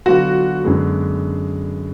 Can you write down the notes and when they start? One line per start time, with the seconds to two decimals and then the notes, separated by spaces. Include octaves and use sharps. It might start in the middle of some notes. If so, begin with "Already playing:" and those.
0.06 D3 F#3 B3 F4 F#4
0.63 F#2 D3 G#3 B3